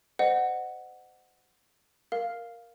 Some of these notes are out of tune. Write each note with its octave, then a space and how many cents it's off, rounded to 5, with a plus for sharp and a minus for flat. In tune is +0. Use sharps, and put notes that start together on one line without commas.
C5 -25 D#5 -35 F#5 +0
A#4 +0 F5 +0